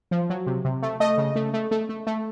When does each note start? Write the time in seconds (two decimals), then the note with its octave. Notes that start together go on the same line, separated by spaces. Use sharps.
0.11 F3
0.30 F#3
0.47 C3
0.65 C3
0.82 A3
1.00 A3 D#5
1.18 C#3
1.36 A3
1.54 A3
1.71 A3
1.89 A3
2.07 A3